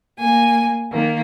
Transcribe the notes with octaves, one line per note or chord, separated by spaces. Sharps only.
A#3 G#5
D#3 A#3